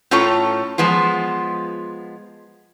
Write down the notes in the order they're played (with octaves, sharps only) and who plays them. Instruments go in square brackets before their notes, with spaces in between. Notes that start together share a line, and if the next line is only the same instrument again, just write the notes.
[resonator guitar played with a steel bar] A2 C#4 F4 A4 C#5 A#5
F3 G#3 B3 F4